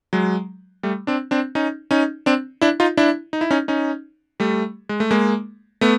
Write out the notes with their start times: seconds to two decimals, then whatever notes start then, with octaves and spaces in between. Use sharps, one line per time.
0.13 F#3 G#3
0.83 G3 A3
1.07 C4 D4
1.31 C4 D4
1.55 C#4 D#4
1.91 C#4 D#4
2.26 C4 D4
2.61 D4 E4
2.80 D#4 F4
2.97 D4 E4
3.33 D#4
3.41 E4
3.51 C#4 D#4
3.68 C#4 D#4
4.40 G3 A3
4.89 G#3
5.00 A3
5.11 G#3 A#3
5.81 A3 B3